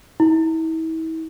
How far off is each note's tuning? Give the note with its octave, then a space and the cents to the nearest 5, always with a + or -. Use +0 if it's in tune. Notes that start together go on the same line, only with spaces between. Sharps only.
E4 -40